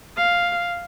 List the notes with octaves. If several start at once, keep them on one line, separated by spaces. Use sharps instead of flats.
F5